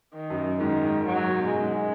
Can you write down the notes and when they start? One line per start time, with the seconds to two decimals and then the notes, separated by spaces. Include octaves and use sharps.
0.15 D#3
0.30 F#2
0.60 G#2 D#3
0.84 G#2
1.06 G#2 F#3
1.20 G#2
1.29 B2
1.51 F#2 G#3
1.60 G#2
1.69 F#2